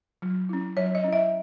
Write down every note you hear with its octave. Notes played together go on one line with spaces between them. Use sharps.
F#3
C#4 E4
F#3 C#5
D#5
C#4 E4
E5